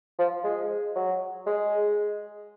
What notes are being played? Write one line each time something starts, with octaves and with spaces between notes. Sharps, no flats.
F3
G#3
F#3
G#3